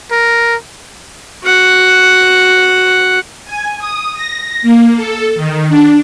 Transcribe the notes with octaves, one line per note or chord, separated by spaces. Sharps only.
A#4
F#4 F#5
G#5
D#6
A#6
A#3
A4
D#3
D4